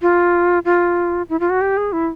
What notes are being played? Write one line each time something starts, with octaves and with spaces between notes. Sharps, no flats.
F4
F4
E4
F4
F#4
G4
G#4
E4